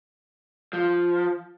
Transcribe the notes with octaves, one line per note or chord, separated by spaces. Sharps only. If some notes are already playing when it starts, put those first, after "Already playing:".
F3